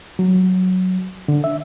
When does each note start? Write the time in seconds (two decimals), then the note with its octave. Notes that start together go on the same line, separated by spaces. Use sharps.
0.19 F#3
1.28 D3
1.44 E5